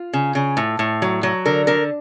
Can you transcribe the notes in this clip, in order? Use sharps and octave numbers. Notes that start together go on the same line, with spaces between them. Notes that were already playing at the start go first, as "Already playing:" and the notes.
Already playing: F4
C#3
C#3
A2
A2
F#3
F#3
D3 A#4
D3 A#4